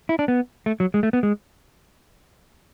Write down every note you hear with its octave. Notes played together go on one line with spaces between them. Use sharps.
E4
D4
B3
A3
F#3
G#3
A3
B3
G#3